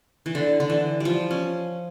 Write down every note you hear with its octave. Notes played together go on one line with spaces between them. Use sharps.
E3
D3
D3
E3
F3 G3
C#4